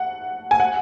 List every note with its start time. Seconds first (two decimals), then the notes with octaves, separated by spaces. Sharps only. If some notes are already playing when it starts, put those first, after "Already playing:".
Already playing: F#5
0.51 G#5
0.60 F#5